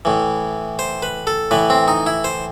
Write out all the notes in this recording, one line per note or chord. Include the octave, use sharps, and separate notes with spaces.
A2 E3
C5
B4
A4
A2 E3 B4
C4
D#4
E4
C5